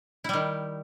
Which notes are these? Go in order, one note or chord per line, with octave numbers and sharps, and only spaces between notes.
D#3 G3 E4